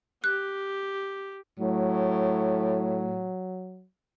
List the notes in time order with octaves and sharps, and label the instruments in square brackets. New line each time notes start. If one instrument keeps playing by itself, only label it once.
[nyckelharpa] G4 [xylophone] F#6
[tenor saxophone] A2 [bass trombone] F#3